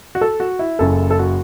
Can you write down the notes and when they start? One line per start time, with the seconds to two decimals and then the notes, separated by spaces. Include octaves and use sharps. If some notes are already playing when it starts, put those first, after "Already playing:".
0.15 F#4
0.21 A4
0.40 F#4
0.59 E4
0.79 F#1 F#2 C#3 A4
1.11 A4
1.19 F#4